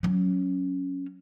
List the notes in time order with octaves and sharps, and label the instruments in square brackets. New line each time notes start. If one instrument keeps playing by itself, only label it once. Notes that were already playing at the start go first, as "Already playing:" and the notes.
[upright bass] F#3 C#4